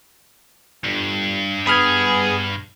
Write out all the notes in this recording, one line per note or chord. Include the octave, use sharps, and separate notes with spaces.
G1 G2
B3 G#4 B5 F6 G#6